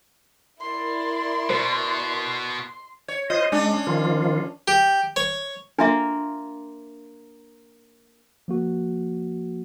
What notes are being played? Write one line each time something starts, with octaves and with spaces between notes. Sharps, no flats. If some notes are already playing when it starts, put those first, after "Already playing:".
E4 A#4 D5 C6
B2 C5
C#5
F4 C5 D#5
G#3 C#4 D4
D#3 F3 F4
G4
C#5
A#3 D4 F4 A#4 E5
F3 A#3 F#4